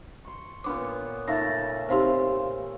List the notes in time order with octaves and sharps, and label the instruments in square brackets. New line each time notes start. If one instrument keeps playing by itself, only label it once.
[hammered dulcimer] C6 C#6
[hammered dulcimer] A#2 B3 C#5 [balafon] D4 D6
[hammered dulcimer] A#2 C#3 A3 [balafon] D#4 E5 F5 [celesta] A6 A#6
[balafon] C4 D#4 G4 [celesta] C5 F5 C6